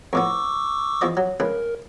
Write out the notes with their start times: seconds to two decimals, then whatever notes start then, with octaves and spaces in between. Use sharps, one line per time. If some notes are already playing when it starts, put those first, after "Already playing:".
0.13 F2 A2 B3 C#6 D6 E6
1.01 E2 F3 D#5
1.17 F#3
1.40 C#2 C#3 A#4 B4